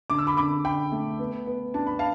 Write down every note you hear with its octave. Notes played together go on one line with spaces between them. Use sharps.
D3 D6
E6
B5 D6
D3 B5 D6
D3 G5 B5
A3
B3
B3
D4 A5
B5
F5 A5